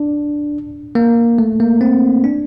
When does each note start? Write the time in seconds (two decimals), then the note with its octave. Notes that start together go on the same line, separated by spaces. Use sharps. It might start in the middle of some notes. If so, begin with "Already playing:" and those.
Already playing: D4
0.95 A#3
1.38 A3
1.60 A#3
1.81 C4
2.24 D4